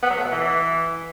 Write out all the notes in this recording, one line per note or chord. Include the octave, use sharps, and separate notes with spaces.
B3
F#3
A3
B2
E3